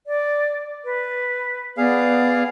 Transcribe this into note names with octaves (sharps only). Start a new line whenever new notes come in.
D5
B4
B3 G#4 D5 F5